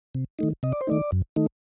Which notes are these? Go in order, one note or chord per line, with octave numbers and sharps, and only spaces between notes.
C3
D#3 A3 D#4
C3 D#5
D5
C5
D#3 A3 D#4 D5
F#2
D#3 A3 D#4